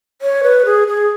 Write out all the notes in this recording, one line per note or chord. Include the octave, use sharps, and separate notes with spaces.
C#5
B4
G#4
G#4